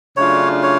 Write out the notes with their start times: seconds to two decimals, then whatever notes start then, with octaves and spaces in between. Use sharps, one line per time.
0.16 C#3 F#3 A3 D4 F4 C#5
0.63 C#5